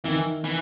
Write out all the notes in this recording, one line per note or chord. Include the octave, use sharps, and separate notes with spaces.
D#3 E3
E3